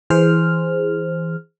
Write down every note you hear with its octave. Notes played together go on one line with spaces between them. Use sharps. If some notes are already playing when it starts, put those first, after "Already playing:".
E3 G#4 C5 F6